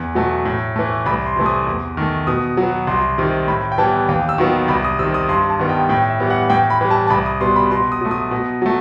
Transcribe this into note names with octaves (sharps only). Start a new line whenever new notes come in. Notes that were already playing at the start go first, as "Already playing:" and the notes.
Already playing: E2
B2 F#3 A3
A2
E3 A3
C2 B5
C6
C3 E3 A3
D#6
E2
D#3 A3
B2 D#6
F#3 B3
C2 C6
C3 D#3
A2 B5
G5
E3 G3 B3 A5
D#2 G5
E6
D#3 F#3 B3
C2 B5
D#6
C3 D#3 E6
D#6
G2 C6
A5
D#3 G3 B3
G5
A2 G5
E5
E3 G3 B3
F#5
A2 G5
B5
E3 G3
A5
A5
C2 B5
D#6
B2 G3 B3 C6
B5
B2 C6
D#6
F#3 A3
D#6
B2
F#3 A3